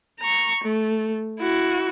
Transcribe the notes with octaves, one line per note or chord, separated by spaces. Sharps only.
A#5 C#6
A3
E4 F#4